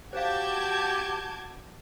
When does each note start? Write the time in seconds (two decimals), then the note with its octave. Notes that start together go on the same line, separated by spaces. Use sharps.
0.13 F#4 G4 C5 F5 A5 D6 G6 G#6